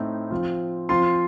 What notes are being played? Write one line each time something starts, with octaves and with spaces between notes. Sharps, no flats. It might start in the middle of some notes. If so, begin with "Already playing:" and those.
Already playing: A2 A3 C4 D#4
F3 C4 F4
F3 C4 F4 C6